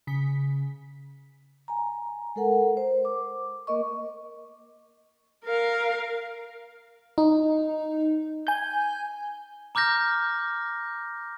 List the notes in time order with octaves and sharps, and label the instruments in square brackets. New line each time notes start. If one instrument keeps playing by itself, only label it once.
[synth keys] C#3 B6
[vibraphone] G#5 A#5
G#3 A4 A#4 F#5
C5
D6
A#3 A#4 D#5 C#6
[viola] A#4 F5
[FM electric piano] D#4
G#5 G6
[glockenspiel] A#5 D6 F6 G6 A#6